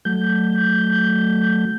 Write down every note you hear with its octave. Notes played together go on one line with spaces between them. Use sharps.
F#3 A3 G6